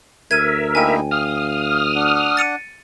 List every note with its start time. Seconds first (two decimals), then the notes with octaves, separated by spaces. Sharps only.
0.31 D2 A#4 E5 G#6 D#7
0.75 A#3 D#4 E4 G5 G#5
1.11 F5 D#6 F6
1.95 D4 F#5
2.37 A6 C#7 D#7